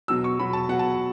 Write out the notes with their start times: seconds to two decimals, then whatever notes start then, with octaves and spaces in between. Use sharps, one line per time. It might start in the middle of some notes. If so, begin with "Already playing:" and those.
0.08 B2 F#3 E6
0.24 C#6
0.39 B2 F#3 B5
0.53 A5
0.69 B2 F#5
0.72 F#3
0.79 A5